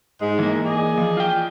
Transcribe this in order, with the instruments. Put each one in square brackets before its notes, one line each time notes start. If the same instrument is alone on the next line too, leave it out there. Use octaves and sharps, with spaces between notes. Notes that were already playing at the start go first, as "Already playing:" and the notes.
[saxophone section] G#2 G#3
[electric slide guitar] E3 A#3
[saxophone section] G#4 D5 D#5
[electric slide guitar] F3
F4 G5